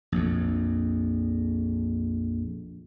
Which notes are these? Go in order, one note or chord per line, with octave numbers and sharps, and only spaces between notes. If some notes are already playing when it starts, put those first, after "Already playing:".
A#1 F2